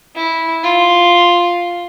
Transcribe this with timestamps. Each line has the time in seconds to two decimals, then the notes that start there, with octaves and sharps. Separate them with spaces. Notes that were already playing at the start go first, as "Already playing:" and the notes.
0.16 E4
0.63 F4